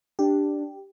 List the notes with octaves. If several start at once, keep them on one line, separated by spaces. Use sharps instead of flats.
D4 G4